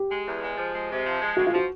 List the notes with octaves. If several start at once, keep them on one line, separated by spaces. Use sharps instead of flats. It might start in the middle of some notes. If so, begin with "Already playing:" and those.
Already playing: G4
G#3
E2
G#3
F3
G#3
C3
F3
G#3
D2 F#4
F4
F3 F#4